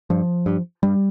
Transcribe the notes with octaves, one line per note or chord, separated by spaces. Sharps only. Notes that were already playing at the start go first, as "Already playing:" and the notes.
G2 F3
G2
G2 G3